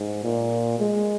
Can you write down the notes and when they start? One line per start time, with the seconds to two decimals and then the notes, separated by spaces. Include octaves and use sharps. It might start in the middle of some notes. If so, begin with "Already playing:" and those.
Already playing: G#2
0.24 A#2
0.79 G#3